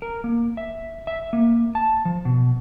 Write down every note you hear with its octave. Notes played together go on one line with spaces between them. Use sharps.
A#4
A#3
E5
E5
A#3
A5
F3
B2